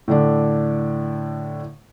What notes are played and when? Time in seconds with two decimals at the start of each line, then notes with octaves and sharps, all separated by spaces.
0.08 A2 D3 D4